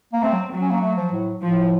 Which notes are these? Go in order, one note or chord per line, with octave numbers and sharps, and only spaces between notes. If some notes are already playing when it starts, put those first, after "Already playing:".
A#3
A3 C4
F#3
F#3
C#4
A#3
A3
F3
A2
A2 F3